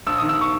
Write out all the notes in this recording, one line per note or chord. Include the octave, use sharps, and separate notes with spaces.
A#1 E6
D#3 D#6
E6
C#6